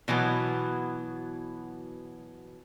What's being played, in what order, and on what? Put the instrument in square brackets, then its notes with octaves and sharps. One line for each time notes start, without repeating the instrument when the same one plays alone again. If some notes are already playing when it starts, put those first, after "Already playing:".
[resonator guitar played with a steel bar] B2 E3 F#3 B3